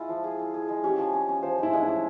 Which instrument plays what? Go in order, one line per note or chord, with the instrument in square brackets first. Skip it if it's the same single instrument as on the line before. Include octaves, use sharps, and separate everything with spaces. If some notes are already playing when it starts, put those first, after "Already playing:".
Already playing: [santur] G#3 E4 [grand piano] F4
[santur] F3
G#4
G#4
G#4
G#3
[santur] C#4 [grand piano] G4
[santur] F3
C#4
C#4
[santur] F3 [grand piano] C5
[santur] G#3 [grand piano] E4
[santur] G#3
[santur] C#4 [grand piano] E4